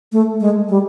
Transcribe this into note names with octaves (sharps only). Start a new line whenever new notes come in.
A3
G#3
G3